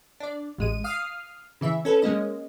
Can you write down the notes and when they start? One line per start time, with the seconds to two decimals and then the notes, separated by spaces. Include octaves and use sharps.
0.20 D4 D5
0.58 A1 G#3 D#7
0.84 F5 D#6 F6 C7
1.61 C#3 E3 E5
1.85 C#4 A4 B4
2.02 G#3 A#3 C#4 D#5